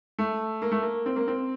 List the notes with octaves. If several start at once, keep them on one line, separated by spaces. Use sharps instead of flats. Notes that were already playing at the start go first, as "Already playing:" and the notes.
A3
A#3
A3
A#3
C4
A#3
C4